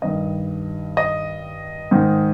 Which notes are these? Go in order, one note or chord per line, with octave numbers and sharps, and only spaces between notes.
G2 D#3 D#5
D#5
G#2 D#3